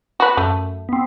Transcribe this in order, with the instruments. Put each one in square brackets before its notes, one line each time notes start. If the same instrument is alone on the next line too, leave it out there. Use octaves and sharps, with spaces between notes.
[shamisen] F#4 B4
[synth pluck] F#2 [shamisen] A3
[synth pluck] B3 C4